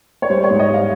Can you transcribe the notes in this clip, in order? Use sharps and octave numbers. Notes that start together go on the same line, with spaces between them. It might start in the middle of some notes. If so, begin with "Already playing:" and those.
C#5
G3 C5
C#5
G#2
D#5
G3 F5